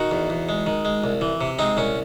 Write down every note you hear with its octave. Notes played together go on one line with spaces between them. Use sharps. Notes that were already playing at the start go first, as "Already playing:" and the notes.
Already playing: D#3 D#4 F#4
E2
E2
G#3
D#3
G#3
C2
E3
C3
G#3 C4 D#4
C2 C#4